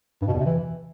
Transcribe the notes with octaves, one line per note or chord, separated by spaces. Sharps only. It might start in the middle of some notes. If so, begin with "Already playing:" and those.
G2
B2
E2
C3
E3